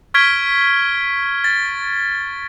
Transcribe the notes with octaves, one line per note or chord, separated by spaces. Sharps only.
C#6 F6 G#6 B6 D7 G7
A6